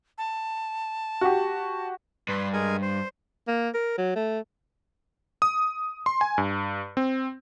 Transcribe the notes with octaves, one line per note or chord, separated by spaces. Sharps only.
A5
F#4 G4
G2 B4 C6
G#3 A#4 G#5
C5
A#3
A#4
F#3
A3
D#6
C6
G#5
G2
C4